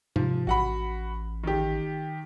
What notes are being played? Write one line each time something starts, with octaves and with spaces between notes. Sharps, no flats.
G#2 C3 F3
A1 F#4 F#5 B5
D#3 G4